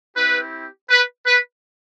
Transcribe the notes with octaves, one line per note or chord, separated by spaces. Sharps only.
C4 E4 G4 B4
B4
B4